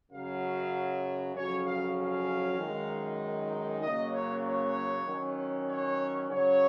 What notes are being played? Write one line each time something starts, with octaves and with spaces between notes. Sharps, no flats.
F#2 C#3 F#3 F5
F2 C#3 F#3 C#4 C#5
F5
F5
F#2 D#3 G#3 D#4
C#3 F#3 A#3 C#4 D#5
C#5
C#5
D#3 F#3 C#4
C#5
C#3 F#3 C#4 C#5